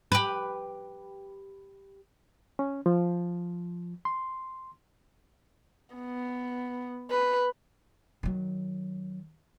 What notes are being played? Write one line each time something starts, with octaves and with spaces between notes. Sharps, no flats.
G4 B4
C#4
F3
C6
B3
B4
D#3 F#3